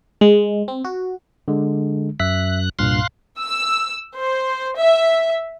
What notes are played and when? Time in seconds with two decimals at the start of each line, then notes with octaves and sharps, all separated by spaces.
0.21 G#3
0.68 C4
0.85 F#4
1.48 D3 G#3
2.20 F#2 E5 F#6 B6
2.79 C2 G2 A#2 F5 C6 F#6
3.39 E6
4.15 C5
4.78 E5